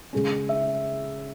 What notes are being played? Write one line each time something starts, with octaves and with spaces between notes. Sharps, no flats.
C#3 G#3 C#4
E5